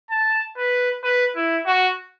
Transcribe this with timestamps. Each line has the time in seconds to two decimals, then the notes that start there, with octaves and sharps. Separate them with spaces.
0.10 A5
0.57 B4
1.04 B4
1.36 E4
1.66 F#4